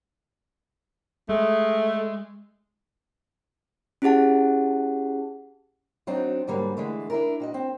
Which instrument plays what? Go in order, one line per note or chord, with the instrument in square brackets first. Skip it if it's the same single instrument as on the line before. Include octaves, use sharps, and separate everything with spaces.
[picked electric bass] G#3 [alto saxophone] A3
[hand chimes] C#4 E4 G4 G#4 F#5 A5
[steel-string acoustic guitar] F#3 C4 D4 D#4 F#4
G#2 D3 F#3 G3 A#3
D3 E3 G#3 A3
D4 E4 A#4
A#2 F#4 D#5
C4